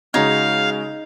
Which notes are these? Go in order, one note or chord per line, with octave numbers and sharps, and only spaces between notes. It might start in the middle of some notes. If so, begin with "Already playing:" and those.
C#3 G#3 C#4 D#4 F#4 D#5 F5 G#6